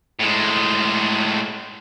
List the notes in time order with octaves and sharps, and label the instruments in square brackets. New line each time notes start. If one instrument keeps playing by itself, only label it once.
[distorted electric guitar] A2 G#3